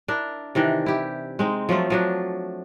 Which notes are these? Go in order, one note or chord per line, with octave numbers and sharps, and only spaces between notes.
D4 E4 A#4
C3 D#3 E3 D4
E4 G4
G#3 C4 D#4
F3 F#3 A3 F4
F3 F#3 D4